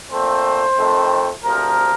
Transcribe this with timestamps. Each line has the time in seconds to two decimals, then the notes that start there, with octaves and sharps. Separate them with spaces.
0.11 A#2 A3 C4 C5
0.77 F2 D#3 A3 C4
1.43 D2 C3 F3 A#4